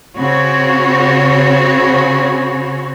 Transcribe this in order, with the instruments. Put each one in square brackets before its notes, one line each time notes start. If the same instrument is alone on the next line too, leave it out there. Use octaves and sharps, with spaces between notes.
[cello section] C#3 C4 F#4 C#5